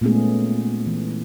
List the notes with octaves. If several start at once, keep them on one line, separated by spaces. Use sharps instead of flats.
A#2 G#3 A3 B3 C#4 G#4
E3